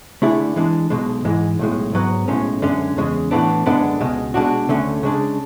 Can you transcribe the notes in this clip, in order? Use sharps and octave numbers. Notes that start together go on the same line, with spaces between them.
D3 A3 E4 G#4 D5
E3 G#3 D4
B1 B2 G#3
G#2 E3 G#3
B1 A2 G#3
G#2 F#3 B3
B1 A2 G#3 C#4
F#2 D3 G#3 C#4
E2 C#3 G#3
A2 E3 B3 D4
F#2 D3 G#3 B3 D4
C#2 B2 G#3
B2 G#3 D4 F#4
D2 D3 A3 C#4
C#3 G#3 D4